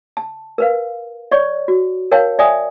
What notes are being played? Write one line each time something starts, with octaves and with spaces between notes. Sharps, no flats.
A5
A#4 B4 F5
C#5 D5 C#6
F#4
A#4 C#5 F5 G5 A5
D5 E5 G5 G#5 D#6